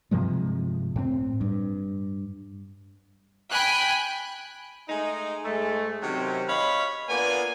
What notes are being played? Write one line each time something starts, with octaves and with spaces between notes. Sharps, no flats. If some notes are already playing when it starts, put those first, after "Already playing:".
G2 C3 F3 G#3
A2 C4
G2
G5 G#5 B5 F#6
G#3 A3 D#4
G#2 G#3 A3
C3 D#3 F#3 C4 C#4
C#5 D#5 F5 B5
A#3 B3 D4 F4 G#5